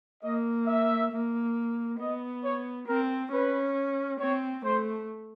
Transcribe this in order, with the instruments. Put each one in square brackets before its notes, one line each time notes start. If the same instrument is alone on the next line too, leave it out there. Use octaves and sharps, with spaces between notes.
[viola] A#3 [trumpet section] D#5
[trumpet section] E5
[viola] A#3
[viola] B3 [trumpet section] D#5
[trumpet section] C#5
[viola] C4 [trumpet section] A#4
[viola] C#4 [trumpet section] B4
[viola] C4 [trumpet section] C#5
[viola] A3 [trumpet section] C5